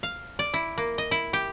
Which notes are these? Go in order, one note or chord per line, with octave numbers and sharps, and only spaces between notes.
F5
D5
E4
A#3
D#5
E4
G4